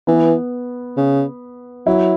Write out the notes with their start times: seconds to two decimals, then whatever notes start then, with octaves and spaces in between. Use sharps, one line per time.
0.07 E3 B3
0.97 C#3
1.87 F#3 E4